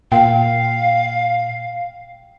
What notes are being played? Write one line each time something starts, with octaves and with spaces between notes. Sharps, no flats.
A#2 F5 G5